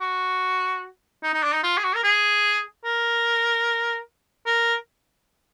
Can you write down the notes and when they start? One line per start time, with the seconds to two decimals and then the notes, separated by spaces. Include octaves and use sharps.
0.01 F#4
1.23 D#4
1.33 D#4
1.43 D4
1.53 D#4
1.64 F4
1.78 G#4
1.84 F#4
1.95 A#4
2.04 G#4
2.85 A#4
4.46 A#4